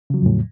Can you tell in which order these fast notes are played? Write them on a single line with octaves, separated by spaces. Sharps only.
C#3 F#3 F3 E2 A2